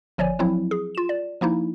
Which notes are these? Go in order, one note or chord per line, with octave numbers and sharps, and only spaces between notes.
G1 F3 C#5 D5 G#5
F3 F#3 C4 E4
G#4
F4 E7
D5
F3 A#3 D#4 E4